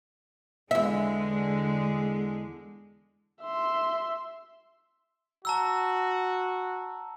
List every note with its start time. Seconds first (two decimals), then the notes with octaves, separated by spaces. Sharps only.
0.71 E2 D3 G#3 E5
3.42 E5 C6
5.45 F#4 A5 A#5 E6